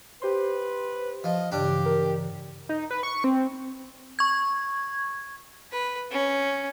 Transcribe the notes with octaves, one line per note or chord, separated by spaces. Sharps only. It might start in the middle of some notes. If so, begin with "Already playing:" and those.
G4 B4 C5 C6
F3 D#5
G2 C#3 E3 D4 G4
A#4
D#4
B4
C#6
C4
C#6 G#6
B4
C#4